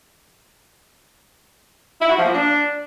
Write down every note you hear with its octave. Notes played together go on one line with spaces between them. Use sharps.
E4
F#4
F3
A#3
D4